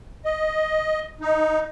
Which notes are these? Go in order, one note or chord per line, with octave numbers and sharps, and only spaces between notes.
D#5
D#4